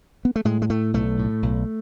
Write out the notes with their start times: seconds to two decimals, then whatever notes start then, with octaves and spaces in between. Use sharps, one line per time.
0.25 B3
0.36 A3
0.45 A2 G#3
0.62 G#3
0.70 A2 A3
0.94 B1 A3
1.19 A2
1.43 B1